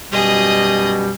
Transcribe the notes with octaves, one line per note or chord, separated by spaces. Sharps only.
F#2 B2 G3 G#4 D#5